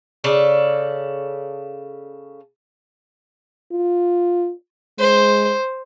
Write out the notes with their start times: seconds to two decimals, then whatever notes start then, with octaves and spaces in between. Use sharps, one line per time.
0.24 C#3 A4 D5
3.72 F4
4.99 G#3 C5